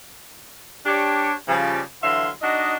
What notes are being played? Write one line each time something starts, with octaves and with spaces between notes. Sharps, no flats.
D4 G4 C#5
C#3 F3 G3
D3 E3 F#3 E5 F5 C6
D4 D#4 F#4 D#5